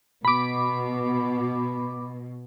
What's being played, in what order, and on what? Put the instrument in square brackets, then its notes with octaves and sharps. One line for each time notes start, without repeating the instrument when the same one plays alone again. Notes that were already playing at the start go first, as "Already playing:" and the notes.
[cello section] B2 [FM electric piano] B5 D6